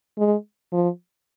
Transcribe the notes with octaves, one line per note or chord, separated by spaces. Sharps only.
G#3
F3